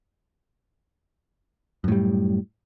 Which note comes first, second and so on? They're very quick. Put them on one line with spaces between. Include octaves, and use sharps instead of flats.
F#2 A2 G3